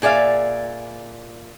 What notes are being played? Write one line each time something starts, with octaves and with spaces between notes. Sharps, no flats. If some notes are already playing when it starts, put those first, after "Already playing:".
A#2 G#4 D5 E5 F5